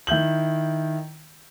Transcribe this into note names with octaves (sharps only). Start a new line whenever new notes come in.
D#3 E4 G6 F#7